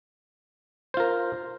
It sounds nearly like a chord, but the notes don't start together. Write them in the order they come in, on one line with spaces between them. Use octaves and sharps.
C5 F4 A#4